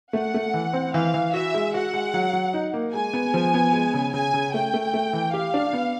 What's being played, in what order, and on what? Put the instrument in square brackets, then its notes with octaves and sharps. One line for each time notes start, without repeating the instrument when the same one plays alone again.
[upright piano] A3 [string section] F#5
[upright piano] A3
E3
C4
[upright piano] E3 [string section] F5
[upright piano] E3
[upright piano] F#4 [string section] E5
[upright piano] G#3
[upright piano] F#4 [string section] F#5
[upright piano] G#3
F#3
F#3
D#4
A#3
[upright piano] G#3 [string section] G#5
[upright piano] B3
F3
B3
G#3
C#3
[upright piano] C#3 [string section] G#5
[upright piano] C#3
[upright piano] A3 [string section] G5
[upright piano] A3
A3
E3
[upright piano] G4 [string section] F5
[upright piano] D4
B3